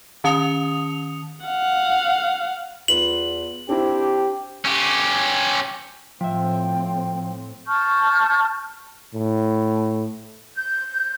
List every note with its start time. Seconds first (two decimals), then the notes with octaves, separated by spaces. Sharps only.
0.24 D#3 C#4 A5 D#6 C#7 F7
1.46 F5 F#5
2.88 E2 F4 B4 F#7
3.69 C4 D4 E4 G4
4.65 C#4 G4
6.21 A2 F3 C4 E5 G5
7.67 A5 C#6 F6 G6
9.14 A2
10.57 G6